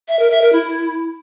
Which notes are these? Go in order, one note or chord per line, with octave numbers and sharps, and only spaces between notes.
E5
A#4
E5
A#4
E4